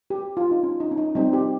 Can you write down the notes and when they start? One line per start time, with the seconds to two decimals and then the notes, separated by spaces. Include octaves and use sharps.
0.10 G4
0.37 F4
0.51 D#4
0.63 C#4
0.80 D#4
0.91 C#4
0.98 D#4
1.15 G3 C4 D#4
1.33 G4